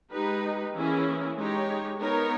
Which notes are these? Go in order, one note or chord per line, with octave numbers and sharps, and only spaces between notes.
G#3 D#4 G4 B4
E3 A#3 C#4 E4 G#4
G#3 D#4 G4 C#5
B3 D#4 A#4 C#5